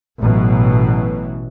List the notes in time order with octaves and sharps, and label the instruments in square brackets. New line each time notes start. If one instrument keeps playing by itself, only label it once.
[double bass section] A1 B2 E3 F#3